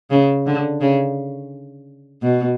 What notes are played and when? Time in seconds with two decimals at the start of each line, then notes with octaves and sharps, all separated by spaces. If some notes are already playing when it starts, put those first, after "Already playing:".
0.10 C#3
0.46 D3
0.81 C#3
2.22 B2